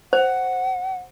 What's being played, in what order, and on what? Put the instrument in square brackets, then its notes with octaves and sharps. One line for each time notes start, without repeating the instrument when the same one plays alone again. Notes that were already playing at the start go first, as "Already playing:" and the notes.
[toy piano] C5 [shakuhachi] F#5